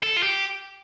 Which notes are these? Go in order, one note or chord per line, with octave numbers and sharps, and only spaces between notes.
A4
F4
G4